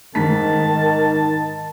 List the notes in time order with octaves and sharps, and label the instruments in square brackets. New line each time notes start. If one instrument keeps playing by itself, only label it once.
[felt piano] G#2 B6 [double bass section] D#3 [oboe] A5